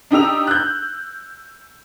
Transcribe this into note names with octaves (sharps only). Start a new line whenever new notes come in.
D4 D#4 G4 E6 F7
F#6 G6